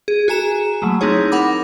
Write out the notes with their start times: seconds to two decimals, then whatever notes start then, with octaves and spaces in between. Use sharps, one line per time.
0.08 G#4
0.28 F#4 G#4 G#5 A#5 E7
0.82 F#3 A3 A#3
1.01 C4 D#4 E4 G#4 C#5
1.32 A#4 F#5 B5 D6